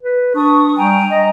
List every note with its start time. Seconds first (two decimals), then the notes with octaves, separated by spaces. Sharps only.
0.03 B4
0.35 D4 C#6 D#6
0.77 G3 G5 G#5 A#5
1.11 D#5 A#5